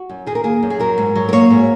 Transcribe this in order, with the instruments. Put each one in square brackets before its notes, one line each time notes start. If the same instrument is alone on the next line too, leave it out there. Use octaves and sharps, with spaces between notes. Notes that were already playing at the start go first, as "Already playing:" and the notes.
Already playing: [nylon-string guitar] F#4
F#2
D#3 G#4
A#4
A#3 G#4
F#2
G#4
F#3 A#4
G#2
F#3
A#4
A#3 C#5
G#2